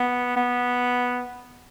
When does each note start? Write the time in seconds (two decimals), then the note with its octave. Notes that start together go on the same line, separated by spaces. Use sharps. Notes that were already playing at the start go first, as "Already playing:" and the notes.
Already playing: B3
0.36 B3